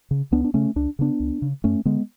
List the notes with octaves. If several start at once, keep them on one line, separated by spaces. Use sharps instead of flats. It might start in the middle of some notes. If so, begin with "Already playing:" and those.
C#3
C#2 B3 D4
D4
C#3 A3 C#4
C#2 D4
C#3 B3 D4
C#2
C#3
F#2 A3 C#4
D3 G#3 B3